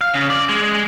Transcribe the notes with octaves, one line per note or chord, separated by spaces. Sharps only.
F5
C#3
D5
G#3